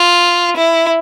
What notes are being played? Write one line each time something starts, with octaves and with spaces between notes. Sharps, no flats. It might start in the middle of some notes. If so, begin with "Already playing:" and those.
Already playing: F4
E4